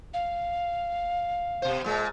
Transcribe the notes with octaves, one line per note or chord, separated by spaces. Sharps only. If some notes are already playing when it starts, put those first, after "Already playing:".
F5
B2 C5
A#2 G#3